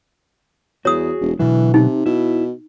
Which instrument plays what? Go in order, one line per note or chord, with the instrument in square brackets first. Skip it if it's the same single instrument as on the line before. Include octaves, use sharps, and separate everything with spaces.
[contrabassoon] E2 [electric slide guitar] F#4 G#4 [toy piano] C#5 D#6
[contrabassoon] E1
[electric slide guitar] B2 D3 F#3 [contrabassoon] E3
[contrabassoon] C3 [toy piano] D#4
[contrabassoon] B2 [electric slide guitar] E4